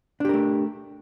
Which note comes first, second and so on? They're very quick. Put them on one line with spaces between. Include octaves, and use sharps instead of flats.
D4 G4 A#4 A3